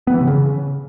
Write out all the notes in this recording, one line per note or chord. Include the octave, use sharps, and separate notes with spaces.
B3
E3
C3
C#3